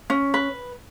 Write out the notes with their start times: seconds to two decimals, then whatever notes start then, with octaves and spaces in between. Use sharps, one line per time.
0.10 C#4
0.34 B4